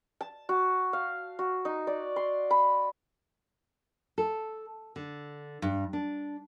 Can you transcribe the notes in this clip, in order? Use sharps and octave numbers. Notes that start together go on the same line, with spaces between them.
A5
F#4
F5
F#4
D#4
D5
C6
B5
A4
D3
G2
D4